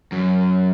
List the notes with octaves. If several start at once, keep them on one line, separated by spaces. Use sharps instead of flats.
F#2